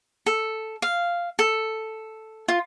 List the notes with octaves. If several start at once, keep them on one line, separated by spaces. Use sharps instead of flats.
A4
F5
A4
F4